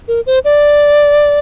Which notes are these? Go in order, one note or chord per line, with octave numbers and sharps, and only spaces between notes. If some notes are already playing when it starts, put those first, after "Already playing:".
A#4
C5
D5